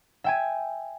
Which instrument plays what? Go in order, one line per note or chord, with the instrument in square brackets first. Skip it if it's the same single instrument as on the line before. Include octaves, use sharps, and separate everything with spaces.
[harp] E5 G5 G#5